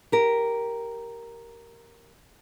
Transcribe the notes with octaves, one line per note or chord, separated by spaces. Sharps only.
G4 A#4